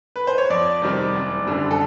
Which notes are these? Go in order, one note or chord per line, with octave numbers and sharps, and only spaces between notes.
B4
C5
C#5
F2 D5
C3 D#3 G3 C4
F#1
F#2 D3 G3
A4